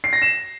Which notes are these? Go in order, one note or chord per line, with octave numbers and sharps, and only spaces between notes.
C7
A#6
E7